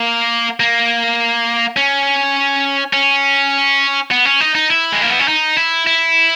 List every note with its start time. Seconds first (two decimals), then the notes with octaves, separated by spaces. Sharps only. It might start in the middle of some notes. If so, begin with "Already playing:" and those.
Already playing: A#3
0.60 A#3
1.77 C#4
2.93 C#4
4.11 B3
4.25 C#4
4.40 D#4
4.55 D#4
4.70 E4
4.92 G#3
5.02 A#3
5.10 B3
5.20 C#4
5.28 D#4
5.57 E4
5.87 E4